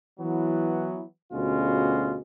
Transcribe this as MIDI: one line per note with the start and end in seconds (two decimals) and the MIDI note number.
0.20 1.02 52
0.20 1.02 54
0.20 1.02 59
1.33 2.19 38
1.33 2.19 47
1.33 2.19 61
1.33 2.19 65
1.33 2.19 66
1.33 2.19 68